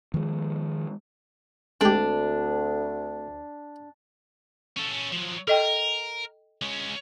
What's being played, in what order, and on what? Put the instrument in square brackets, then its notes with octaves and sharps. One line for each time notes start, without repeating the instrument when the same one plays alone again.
[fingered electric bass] D#3 F3 G#3
[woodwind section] D2 [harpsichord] G#3 G4 [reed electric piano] A3 C4 A4 [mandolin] D4
[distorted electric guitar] C#4 A4
F3 F#3
[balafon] A4 D#5 G5 [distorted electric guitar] A#4
[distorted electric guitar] G#3 C#4